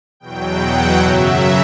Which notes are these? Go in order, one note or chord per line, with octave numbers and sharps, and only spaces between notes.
E2 B2 F#3 G5
F#5
F#2 C#3 F#3 E5